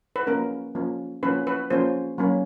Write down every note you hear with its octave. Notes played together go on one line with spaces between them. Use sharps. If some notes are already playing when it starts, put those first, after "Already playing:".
B4
F3 A#3 C#4 A#4
F3 A#3 C#4
F3 A#3 C#4 B4
B4
F3 A#3 C#4 C5
F#3 A#3 C#4